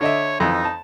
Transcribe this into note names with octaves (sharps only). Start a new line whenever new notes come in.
D3 C#5 D#5 E5
F2 E3 D#4
A5